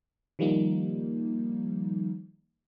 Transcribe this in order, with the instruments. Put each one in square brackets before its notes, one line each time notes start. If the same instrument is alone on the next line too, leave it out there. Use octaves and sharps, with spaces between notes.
[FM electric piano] D#3 F3 G3 A#3 D#4